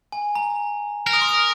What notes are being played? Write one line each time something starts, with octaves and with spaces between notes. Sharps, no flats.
G#5
A#5
A#4 F6
D#6
C6
D#6